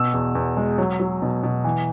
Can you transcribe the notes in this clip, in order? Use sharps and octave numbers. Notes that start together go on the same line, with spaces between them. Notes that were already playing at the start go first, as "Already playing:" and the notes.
Already playing: B2 E6
E2
E2
G#3
F#3
F#3
B2
B2
E3